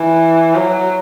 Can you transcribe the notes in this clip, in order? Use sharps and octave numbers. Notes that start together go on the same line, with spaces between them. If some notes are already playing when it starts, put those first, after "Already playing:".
Already playing: E3
F#3